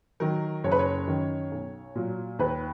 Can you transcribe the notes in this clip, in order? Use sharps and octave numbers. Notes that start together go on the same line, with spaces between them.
D#3 F#3 A#4
F#1 C#5
B4
C#5
F#2 D#3
B1
A#2 F#3
D#2 B4